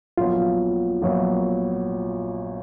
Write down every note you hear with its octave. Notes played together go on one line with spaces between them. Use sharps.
A#1 A#2 F#3 B3 F4
A#1 A#2 F#3 B3